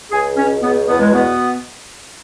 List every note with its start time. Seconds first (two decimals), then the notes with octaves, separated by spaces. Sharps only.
0.11 C#2 G#4
0.36 B2 C#4
0.61 C#2 B3
0.86 E2 B3
1.00 G#3
1.12 B2 B3